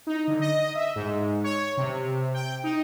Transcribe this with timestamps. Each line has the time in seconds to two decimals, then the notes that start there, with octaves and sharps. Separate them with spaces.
0.07 D#4
0.27 D3
0.41 D#5
0.75 E5
0.96 G#2
1.44 C#5
1.77 C3
2.34 G5
2.64 D#4